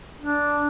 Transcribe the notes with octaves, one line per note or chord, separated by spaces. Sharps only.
D4